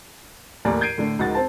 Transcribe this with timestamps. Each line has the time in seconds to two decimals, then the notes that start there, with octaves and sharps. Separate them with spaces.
0.65 D#2 A2 A#4 D5 G#5
0.81 G6 G#6 C7 D7 D#7
0.98 A2 D3 A3
1.19 C#2 D#4 F#4 A#4 A6
1.35 C4 C5 A5